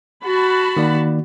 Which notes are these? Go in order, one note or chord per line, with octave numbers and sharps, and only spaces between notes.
F#4 A5 B5
D#3 A#3 D5